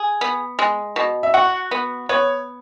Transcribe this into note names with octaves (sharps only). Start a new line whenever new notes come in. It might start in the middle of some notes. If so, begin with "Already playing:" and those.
Already playing: G#4
B3
G#3
B2
E5
F#4 F#5
B3
B3 C#5